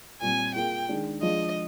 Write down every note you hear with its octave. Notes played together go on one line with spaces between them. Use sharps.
A#2 G3 C4 G#5
A#3 F4 G#4 G5
D#3 G#3 D4
F3 G#3 D4 F4 D#5